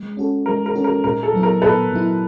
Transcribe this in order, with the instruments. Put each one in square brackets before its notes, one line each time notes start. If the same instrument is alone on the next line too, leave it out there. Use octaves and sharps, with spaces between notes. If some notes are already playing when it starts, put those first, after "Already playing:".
Already playing: [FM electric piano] G#3
C#4 F#4 A4
[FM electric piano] G#3 [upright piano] A#4
[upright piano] A#4
[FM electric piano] C#4 F#4 A4
[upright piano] A#4
[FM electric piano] A#2 [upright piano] A#4
[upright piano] A4
[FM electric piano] F#3 B3 E4
[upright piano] A#4
[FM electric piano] A#2 [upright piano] A4 B4
[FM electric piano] F#3 B3 E4